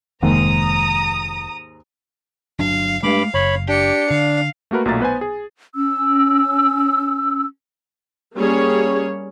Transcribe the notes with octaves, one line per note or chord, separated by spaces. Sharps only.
F1 D#2 G#2 D#3 G#3 A#3 A#5 D#6
G1 F#3 D4 F5
G2 G#3 A3 F5 B5 D6
F#1 C#5 B5
D4 G4 C#7
D3 F5
A3 A#3 F#4 A#4 B4
B1 A#2 F#3 A3 A#5 A6
B3 B4 C5 G#5
G#4
C#4 E6
G3 A#3 C#4 G#4 C#5